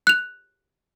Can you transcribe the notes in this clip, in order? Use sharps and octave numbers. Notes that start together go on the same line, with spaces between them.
F#6 F7